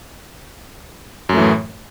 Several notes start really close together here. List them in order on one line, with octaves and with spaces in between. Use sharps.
F#2 A3 E3 A2